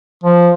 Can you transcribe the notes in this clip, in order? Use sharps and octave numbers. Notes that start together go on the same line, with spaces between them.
F3